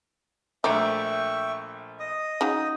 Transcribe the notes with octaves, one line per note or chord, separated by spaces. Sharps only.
A#1 A3 D#4 E5 G5 C#6 D6
D#5 D#6
C#3 F#3 D#4